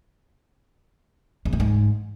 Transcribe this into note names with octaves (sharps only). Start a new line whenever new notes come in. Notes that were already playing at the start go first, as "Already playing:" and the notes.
E2
A2
G#2